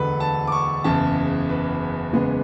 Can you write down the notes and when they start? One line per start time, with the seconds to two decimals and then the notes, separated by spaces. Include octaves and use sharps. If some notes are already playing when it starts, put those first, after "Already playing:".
Already playing: E1 D2 D3 A4 B4
0.20 A5
0.47 D6
0.52 C#6
0.84 F#1 E2 C#3 A5
1.49 B4
2.13 F#1 E2 C#3 G#3 B3